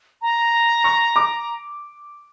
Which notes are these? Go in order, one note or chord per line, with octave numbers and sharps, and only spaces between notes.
A#5
C#6
D6